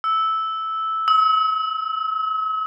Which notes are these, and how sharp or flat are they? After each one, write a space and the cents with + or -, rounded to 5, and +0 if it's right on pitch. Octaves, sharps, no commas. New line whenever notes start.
E6 -10
E6 -45